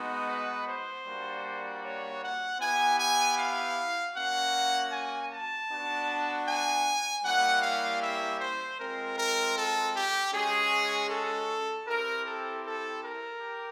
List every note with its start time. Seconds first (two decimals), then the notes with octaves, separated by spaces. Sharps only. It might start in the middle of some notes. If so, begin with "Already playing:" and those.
Already playing: G#3 B3 D#4 F#4
0.28 B4
0.68 C5
1.06 G3 A#3 D4 F#4
1.83 C#5
2.22 F#5
2.60 B3 E4 G4 G#5
2.99 G#5
3.38 F5
4.14 A#3 C#4 F#4 F#5
4.92 G#5
5.30 A5
5.70 B3 D4 F#4
6.47 G#5
7.24 G3 A#3 C#4 E4 G4 F#5
7.62 F5
8.01 E5
8.40 C5
8.78 G#3 C4 F4 A#4
9.18 A#4
9.56 A4
9.95 G4
10.32 G#3 C#4 F#4 G#4
11.10 A4
11.87 C4 E4 G4 A#4
12.26 A4
12.65 A4
13.03 A#4
13.41 G4